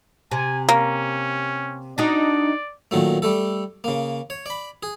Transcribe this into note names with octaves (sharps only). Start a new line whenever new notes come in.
C3 G#5
A#3 C#4
D4 D#4 F#4 D5
A#2 D#3 F#3 A3
G3 A3 A4
C#3 A#3
C#5
D5 B5
G#4